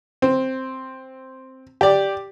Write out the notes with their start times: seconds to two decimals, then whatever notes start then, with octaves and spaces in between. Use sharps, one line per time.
0.22 C4
1.81 G4 D5